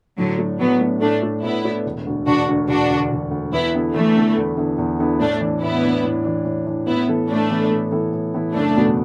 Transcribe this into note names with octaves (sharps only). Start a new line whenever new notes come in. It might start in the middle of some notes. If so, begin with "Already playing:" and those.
A2 D3 F#3
A3 D4
A2 F#3 B3
A3 D4
A2 A3 D4
A3 D4
A2 B3 E4
A3 D4
E1
D2 D3
E1 D4 F#4
D2 D3
E1 D4 F#4
D2 D3
E1
D2 D3
E2 B3 E4
D3 B3 E4 A4
E2 E3 A3
D3 B3 E4 A4
E2
D3 B3 E4 A4
E2
D3 B3 E4 A4
A2 A3 D4
E3 D4
A2 B3 E4
E3 D4
A2
E3 D4
A2
E3 D4
A2 B3 E4
E3 B3 E4 A4
A2 A3 D4
E3 B3 E4 A4
A2
E3 B3 E4 A4
A2
E3 B3 E4 A4
F#1 A3 D4
E2 B2 B3